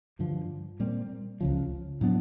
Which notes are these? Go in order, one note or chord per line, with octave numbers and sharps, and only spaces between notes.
G2 D3 F3
A#2 G3 C4
C#2 C#3 F3
A2 F#3 B3 D4